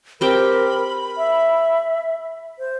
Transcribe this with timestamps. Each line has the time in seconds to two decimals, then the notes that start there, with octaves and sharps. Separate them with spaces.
0.21 C4 G4 A#4 G5 B5
1.17 E5
2.59 C5